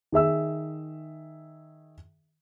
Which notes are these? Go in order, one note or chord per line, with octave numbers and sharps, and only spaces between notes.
D#3 G#4 E5 E6